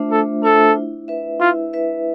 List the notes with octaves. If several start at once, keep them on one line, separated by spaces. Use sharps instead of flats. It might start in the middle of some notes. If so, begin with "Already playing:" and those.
Already playing: A3 D4 F4 C5 E5
A3 A4
D4 F4 A4 C5 E5
E4
B4 E5
E4 F4
B4 E5